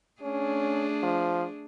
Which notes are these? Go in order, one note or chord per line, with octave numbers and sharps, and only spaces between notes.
A3 C#4 D4 G#4
F3